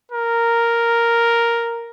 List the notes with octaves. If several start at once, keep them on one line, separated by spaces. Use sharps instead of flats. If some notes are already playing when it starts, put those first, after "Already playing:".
A#4